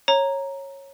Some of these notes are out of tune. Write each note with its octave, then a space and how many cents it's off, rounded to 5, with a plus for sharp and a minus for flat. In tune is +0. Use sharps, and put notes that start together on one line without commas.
C#5 -15 A#5 +0